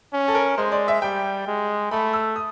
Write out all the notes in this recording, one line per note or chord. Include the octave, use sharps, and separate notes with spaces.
C#4
A4
A#4
G#3 C5
D5
E5
G3 G5
G#3
A3 B5
E6
D#6